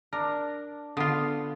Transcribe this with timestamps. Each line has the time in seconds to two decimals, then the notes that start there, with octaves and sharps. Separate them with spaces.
0.13 D4 A#4
0.97 D3 B3 F4